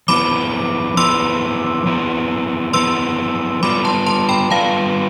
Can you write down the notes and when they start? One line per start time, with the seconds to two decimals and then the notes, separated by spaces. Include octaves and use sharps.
0.08 F3 B3 E4 B4 B5 D6
0.97 F3 B3 E4 B4 C6 E6
1.86 F3 B3 E4 B4
2.73 F3 B3 E4 B4 C6 E6
3.63 G3 B3 F4 B4 D5 B5 D6
3.85 A5 C6
4.06 A5 C6
4.29 G5 B5
4.50 G3 B3 F4 B4 D5 F5 A5